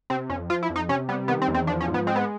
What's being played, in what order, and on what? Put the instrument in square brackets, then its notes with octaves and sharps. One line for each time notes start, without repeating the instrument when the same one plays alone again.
[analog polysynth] C3 C4
F2 C#4
F3 F4
E4
F2
D#4
C3 C#4
G3 B3
D#3 B3
C4
E2
C4
F3 D4
C#4
G#2
B3
G#3 C4
B3